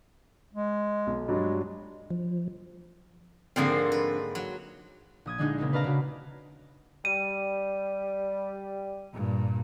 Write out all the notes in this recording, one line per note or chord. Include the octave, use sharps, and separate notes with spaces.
G#3
B1
G2 F#3 G#3 D4
F3
G#2 D3 F3 A#3 C4 G#4
B4
F#3
A#1 D#6 G#6
D3 G#3 D4 D#4 G#4
C#3 A#3 C4 D#4
B4 D5 F5 A5 A#5
C#3 F#4
G3 D#7
G2 A#2